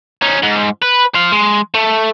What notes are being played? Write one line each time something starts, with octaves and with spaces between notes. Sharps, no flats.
C#4 D#4
G#2
B4
C5 F5
G#3
A3